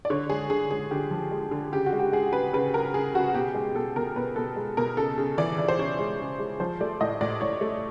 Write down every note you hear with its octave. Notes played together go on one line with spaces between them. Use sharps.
D5
D3 C#5
G#3 G#4
D3 G#4
G#3 G#4
D3 G4
F3
G#3
D3
C#3 G4
F#4
G#3
G4
G#3 G#4
C#3 B4
C#3 B4
C#3 A#4
C#3 G#4
C#3 F#4
B2 G4
G#3 G#4
B2 A4
B2 A#4
B2 B4
B2 A4
G#3
B2 A#4
C#3 A4
C#3
E3 D5
E3
C5
C#3 C#5
G#3
C#3
G#3
F3 C5
A3 D5
A2 D#5
A2 D5
A2 C#5
A3